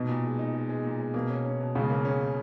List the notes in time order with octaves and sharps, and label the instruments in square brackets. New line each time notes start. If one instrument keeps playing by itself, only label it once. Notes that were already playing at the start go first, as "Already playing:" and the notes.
Already playing: [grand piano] B2 [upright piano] D#4
[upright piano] A#2
G#3
D#4
G#3
G#3
A#2
G#3
[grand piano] B2 [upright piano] A#3
[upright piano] C#4
C#4
B2
[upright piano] C#2 [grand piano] C#3
[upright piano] A#3
C#4